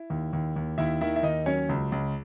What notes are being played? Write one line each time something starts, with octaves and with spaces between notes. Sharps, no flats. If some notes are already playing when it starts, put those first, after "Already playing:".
Already playing: E4
D#2
D#2
D#2
D#2 E4 E5
D#3 E4 E5
E5
D#2 D#4 D#5
F#3 C#4 C#5
C#2
C#2